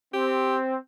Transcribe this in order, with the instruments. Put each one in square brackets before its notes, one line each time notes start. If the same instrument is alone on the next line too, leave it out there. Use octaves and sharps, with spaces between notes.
[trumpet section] C4 [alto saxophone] G4